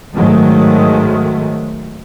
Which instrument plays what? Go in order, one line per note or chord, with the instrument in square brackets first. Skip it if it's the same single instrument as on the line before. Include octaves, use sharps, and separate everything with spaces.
[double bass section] G#2 D#3 F#3 G#3 A3